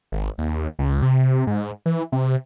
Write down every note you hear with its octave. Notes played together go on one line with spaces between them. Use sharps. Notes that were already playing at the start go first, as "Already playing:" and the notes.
G#1
D#2
C#2
C3
G#2
E3
C3